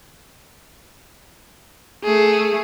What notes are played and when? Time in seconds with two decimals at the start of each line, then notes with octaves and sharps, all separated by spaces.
2.04 A3 G#4